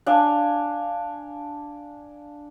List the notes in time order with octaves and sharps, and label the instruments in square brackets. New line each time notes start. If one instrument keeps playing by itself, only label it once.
[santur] D4 F5 G#5